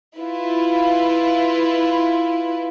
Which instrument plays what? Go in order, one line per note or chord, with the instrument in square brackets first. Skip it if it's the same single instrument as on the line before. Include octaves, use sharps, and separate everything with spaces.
[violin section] E4 F4 B4